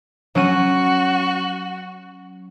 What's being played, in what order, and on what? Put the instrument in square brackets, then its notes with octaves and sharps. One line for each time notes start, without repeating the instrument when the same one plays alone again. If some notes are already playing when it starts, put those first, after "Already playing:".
[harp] F#3 C#4 D#7 [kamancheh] F#4